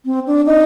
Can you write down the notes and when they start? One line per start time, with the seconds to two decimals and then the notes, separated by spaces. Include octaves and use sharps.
0.05 C4
0.27 D4
0.46 D#4